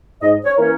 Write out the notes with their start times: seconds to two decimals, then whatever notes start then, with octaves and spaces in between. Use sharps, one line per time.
0.21 G#2 D#5
0.44 C#5
0.56 E3 A#3 C#4 A#4